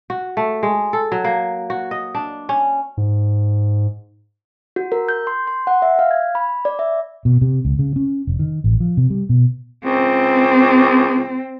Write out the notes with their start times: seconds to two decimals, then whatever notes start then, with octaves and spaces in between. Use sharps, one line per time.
0.10 F#4
0.37 A3
0.63 G#3
0.93 A4
1.12 F#3
1.25 A#3
1.70 F#4
1.91 D#5
2.15 D4
2.49 C#4
2.97 G#2
4.76 F#4
4.92 A#4
5.08 G6
5.27 C6
5.47 C6
5.67 F#5
5.82 E5
5.99 F5
6.11 G#6
6.35 B5
6.65 D5
6.79 E5
7.25 B2
7.41 C3
7.65 C#2
7.79 C#3
7.96 C#4
8.27 F1
8.39 D#3
8.64 A1
8.80 F3
8.97 C3
9.10 G3
9.29 B2
9.85 C#2 C4